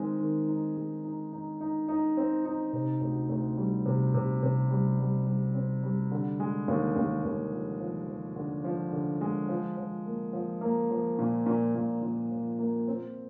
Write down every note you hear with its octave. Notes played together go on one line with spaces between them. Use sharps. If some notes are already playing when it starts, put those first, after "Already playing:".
Already playing: D#3 G#3 C4
D#3
D#4
G#3
D#4
D#4
D#4
D#4
C4
D#4
C3
D2
D2
G3
C3
C3
C3
G3
G3
G3
C4
G3
D3
G#3
D#2
D#2
D#2
F3
F3
F3
D3
F3
D3
G#3
F3
F3
A#3
F3
A#3
F3
A#2
A#2
A#2
A#2
F3
A#3
C4